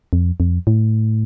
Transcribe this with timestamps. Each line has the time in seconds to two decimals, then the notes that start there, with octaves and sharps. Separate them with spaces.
0.13 F2
0.40 F2
0.67 A2